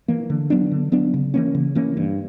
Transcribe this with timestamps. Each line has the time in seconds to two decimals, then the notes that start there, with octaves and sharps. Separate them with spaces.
0.08 E3 A#3
0.30 D3
0.50 F#3 B3 D4
0.71 D3
0.92 F#3 B3 D4
1.14 C#3
1.34 E3 A#3 C#4
1.55 C#3
1.75 E3 A#3 C#4
1.97 G2